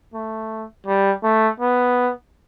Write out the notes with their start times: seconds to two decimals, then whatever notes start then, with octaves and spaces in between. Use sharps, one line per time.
0.14 A3
0.87 G3
1.23 A3
1.60 B3